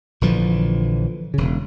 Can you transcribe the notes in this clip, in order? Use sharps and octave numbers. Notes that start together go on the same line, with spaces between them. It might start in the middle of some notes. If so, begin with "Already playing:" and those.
A#1 D3 E3 F3
E1 C#3